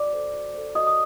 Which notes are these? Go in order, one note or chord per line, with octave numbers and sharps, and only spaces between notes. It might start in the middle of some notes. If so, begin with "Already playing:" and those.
Already playing: F#4 D5 D6
A4 C5
F#4
A4 C5
F#4 D#5 D#6
D#6